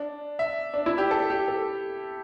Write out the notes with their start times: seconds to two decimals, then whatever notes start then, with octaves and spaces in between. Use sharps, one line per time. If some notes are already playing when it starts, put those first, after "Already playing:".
Already playing: D4
0.39 E5
0.74 D4
0.86 E4
0.98 G4
1.11 A4
1.30 G4
1.48 A4